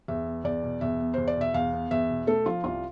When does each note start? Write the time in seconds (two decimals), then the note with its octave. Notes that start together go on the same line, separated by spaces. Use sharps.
0.08 E2 E5
0.27 B3
0.44 E2 D5
0.63 B2
0.81 E2 E5
1.00 B3
1.14 E2 C5
1.28 D5
1.37 B2 E5
1.54 E2 F5
1.73 B3
1.91 E2 E5
2.09 B2
2.27 A3 A4
2.46 F3 F4
2.64 C2 F4